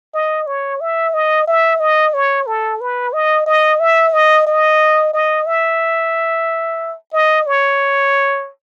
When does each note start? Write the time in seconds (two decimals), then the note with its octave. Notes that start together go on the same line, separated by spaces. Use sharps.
0.14 D#5
0.46 C#5
0.81 E5
1.14 D#5
1.47 E5
1.80 D#5
2.14 C#5
2.47 A4
2.80 B4
3.13 D#5
3.46 D#5
3.80 E5
4.13 D#5
4.46 D#5
5.13 D#5
5.46 E5
7.13 D#5
7.47 C#5